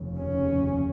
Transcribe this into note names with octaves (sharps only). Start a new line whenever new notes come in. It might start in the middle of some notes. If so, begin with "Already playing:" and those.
Already playing: F1 D#2 C#3
C#4